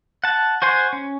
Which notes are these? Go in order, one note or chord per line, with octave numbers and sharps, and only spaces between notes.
F#5 A5
F#4 C5 G#5 C6
C#4